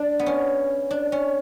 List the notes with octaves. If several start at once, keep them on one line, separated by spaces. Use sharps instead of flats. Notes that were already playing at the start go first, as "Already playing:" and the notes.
Already playing: D4
B3
C#4
D4
C#4